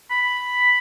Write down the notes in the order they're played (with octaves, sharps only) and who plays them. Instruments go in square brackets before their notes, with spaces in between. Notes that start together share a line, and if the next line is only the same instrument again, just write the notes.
[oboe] B5